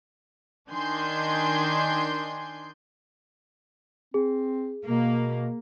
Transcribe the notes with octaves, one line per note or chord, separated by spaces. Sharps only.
D#3 D4 G#5 C6 G6
C4 G#4
B2 A#3